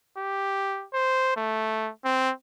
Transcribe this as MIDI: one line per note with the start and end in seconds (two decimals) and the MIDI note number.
0.17 0.85 67
0.93 1.32 72
1.37 1.90 57
2.05 2.31 60